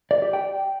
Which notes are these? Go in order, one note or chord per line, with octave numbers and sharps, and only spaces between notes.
D5
G4
G5